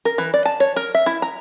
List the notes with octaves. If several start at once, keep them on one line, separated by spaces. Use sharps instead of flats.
A#4
E3
D5
A5
C#5
A#4
E5
E4
A#5